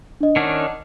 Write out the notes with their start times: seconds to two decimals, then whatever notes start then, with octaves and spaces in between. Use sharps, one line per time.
0.21 D4 D#5
0.36 D#3 C#4 D4 D#5 F#5